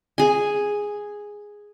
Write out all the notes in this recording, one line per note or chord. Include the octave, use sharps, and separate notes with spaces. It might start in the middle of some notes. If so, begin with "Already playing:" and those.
G#4 G#5